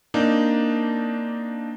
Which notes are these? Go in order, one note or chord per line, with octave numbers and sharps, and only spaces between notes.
A#3 C4 D4 D#4